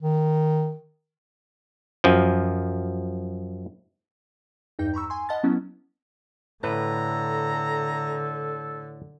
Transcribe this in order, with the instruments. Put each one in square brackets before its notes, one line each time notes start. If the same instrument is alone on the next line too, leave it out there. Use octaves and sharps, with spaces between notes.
[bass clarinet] D#3
[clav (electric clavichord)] F#2 F3
[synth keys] E2 G2 D#4 G5 G6
A#5 B5 C#6 E6
G#5 C6
D#5 F#5 A5 B5 F6 A6
F#3 B3 C#4 E4
[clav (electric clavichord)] A2 B4 [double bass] D3 [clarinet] A4 [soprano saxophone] A#5